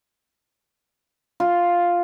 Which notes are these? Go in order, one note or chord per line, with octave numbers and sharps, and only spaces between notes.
F4